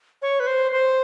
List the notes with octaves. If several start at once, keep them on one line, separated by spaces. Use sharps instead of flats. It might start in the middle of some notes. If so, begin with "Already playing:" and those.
C#5
B4
C5
C5